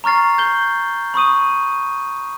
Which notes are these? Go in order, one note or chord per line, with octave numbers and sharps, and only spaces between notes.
A#5 C#6 F6 A6 C7
G6 G7
B5 C#6 D#6 D#7